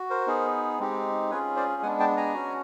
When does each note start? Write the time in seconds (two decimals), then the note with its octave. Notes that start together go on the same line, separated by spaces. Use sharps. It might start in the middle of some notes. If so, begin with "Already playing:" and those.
Already playing: F#4
0.10 A#4 C5
0.27 B3 D#4 G#4
0.80 G#3 C4 D#4 G4
1.31 C#4 F4 G#4 B4 C#5
1.56 C5 D5
1.82 G#3 B3 D4 F#5 G#5
2.00 G5 A5
2.17 G#5 A#5
2.34 C#4 F#4